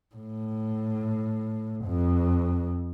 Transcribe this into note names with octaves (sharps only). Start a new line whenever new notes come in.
A2
F2